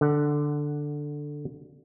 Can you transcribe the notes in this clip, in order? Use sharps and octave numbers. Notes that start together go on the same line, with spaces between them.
D3 F#5